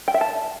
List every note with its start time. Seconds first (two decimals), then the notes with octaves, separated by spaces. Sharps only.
0.08 G5
0.14 E5
0.21 A5